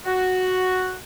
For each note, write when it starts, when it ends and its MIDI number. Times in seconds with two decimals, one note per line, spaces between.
0.06 0.96 66